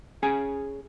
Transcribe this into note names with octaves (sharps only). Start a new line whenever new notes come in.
C#4 G#4 G#5